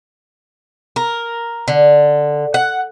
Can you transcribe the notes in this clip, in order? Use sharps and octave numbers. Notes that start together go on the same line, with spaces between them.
A#4
D3
F#5